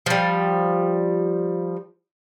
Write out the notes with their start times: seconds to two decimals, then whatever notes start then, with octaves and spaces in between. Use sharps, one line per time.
0.06 F3 G3